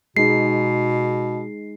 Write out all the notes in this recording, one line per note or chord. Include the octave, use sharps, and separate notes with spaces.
B2 G#3 D#4 C7